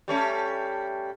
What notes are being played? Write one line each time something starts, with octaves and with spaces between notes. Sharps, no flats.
G3 A3 C#4